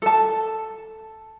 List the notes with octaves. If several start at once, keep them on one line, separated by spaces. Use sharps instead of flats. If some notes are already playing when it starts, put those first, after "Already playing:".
A4 A5